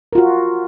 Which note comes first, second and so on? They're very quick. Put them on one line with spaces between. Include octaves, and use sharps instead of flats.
A#4 F4 F#4